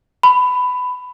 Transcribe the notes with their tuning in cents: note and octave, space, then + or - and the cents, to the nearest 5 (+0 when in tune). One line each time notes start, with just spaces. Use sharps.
B5 +15